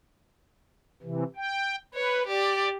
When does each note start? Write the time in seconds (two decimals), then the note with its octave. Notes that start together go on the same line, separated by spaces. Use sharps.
1.02 C3 E3
1.36 G5
1.94 B4 C#5
2.28 G4 D5